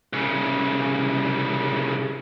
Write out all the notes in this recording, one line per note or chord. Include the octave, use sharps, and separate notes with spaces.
C2 C#3